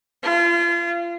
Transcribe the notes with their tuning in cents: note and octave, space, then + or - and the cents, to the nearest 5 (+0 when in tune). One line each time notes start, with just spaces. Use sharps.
F4 -35